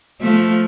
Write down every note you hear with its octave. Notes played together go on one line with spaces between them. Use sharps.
F3 A3